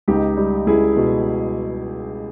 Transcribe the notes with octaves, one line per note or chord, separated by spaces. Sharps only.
C#2 D#4 G4
G3
C#2 E4 G#4
B2